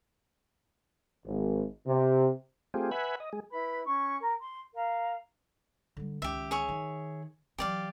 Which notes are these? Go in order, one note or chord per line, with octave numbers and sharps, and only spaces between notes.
G#1
C3
A3 C4 F4 G4 G#4
B4 E5 F#5 G#5 B5
D#5
G#3 G#4
E4 B4 B5
C#4 C#6
A#4
C6
A#4 F5
D3 G3
C#2 D#3 G4 E5
G#4 C#5 E5
D#3
E3 F#3 G4 D5 F5